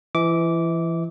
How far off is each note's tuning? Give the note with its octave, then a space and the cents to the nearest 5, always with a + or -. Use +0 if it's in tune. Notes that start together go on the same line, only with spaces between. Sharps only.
E3 +25 E5 -40 D6 -15